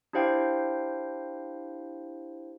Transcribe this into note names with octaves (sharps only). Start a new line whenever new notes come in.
D4 E4 G4 C5 F5 G5